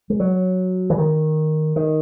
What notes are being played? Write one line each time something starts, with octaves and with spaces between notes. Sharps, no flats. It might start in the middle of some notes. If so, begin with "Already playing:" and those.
G#3
F#3
E3
D#3
D#3